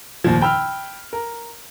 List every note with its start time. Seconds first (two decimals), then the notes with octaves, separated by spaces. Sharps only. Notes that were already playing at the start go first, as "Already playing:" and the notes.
0.24 D#2 A#2 F3
0.41 G5 B5 E6 F6
1.13 A#4